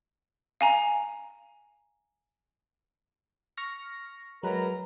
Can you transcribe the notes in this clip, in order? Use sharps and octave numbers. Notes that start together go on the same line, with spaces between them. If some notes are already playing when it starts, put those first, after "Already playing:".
F5 G#5 A#5
C#6 F6 A#6
F#2 F#3 G#3 A#4 B4 A#5